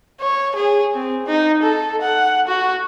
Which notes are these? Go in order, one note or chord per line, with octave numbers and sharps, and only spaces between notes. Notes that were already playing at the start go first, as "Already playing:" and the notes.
C#5
G#4
C4
D#4
A4
F#5
F#4